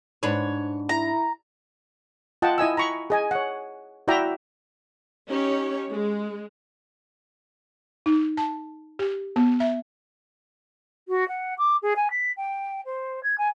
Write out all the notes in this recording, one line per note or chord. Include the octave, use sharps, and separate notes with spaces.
G#2 D4 B4 C#5
E4 A#5
F4 D#5 F#5 G5 A5
E4 D#5 G#5 E6
A#5 B5 C#6
G#4 D#5 G#5
C#5 F#5
E4 F#4 D5 E5 G5 A#5
C#4 D#4 G4 C#5
G#3
D#4
A5
G4
B3
E5
F#4
F#5
D6
G#4
G#5
B6
G5
C5
G#6
G#5